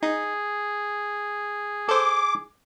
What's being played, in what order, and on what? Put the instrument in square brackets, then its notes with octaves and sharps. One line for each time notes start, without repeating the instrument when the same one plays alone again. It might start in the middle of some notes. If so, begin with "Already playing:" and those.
[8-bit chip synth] D#4 [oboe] G#4
[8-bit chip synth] A4 C5 [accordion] D6